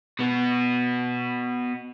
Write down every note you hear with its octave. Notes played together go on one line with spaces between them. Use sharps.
B2 B3